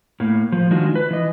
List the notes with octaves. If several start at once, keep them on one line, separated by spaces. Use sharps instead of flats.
A2 A#3
F3
D#3 G#3 D4 D#4 F4 F#4
B4
E3 D#5